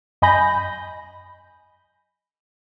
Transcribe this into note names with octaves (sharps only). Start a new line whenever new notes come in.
F#2 D#5 G#5 B5 G6 A#6